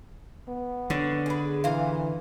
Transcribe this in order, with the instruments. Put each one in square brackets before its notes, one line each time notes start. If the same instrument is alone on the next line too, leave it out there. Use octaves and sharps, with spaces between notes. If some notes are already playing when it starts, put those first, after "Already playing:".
[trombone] B3
[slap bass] D3 [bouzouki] C#4
[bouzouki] G#4 B4
[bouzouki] A#2 F5 [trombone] E3